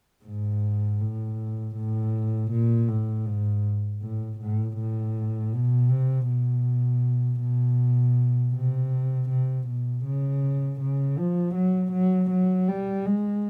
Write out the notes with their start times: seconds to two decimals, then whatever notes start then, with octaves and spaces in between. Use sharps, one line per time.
0.25 G#2
1.00 A2
1.76 A2
2.51 A#2
2.88 A2
3.26 G#2
4.02 A2
4.40 A2
4.77 A2
5.53 B2
5.90 C3
6.27 B2
7.41 B2
8.53 C3
9.29 C3
9.67 B2
10.04 C#3
10.80 C#3
11.18 F3
11.54 F#3
11.92 F#3
12.30 F#3
12.69 G3
13.06 G#3